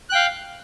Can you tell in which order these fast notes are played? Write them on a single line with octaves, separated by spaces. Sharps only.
F#6 G5 F5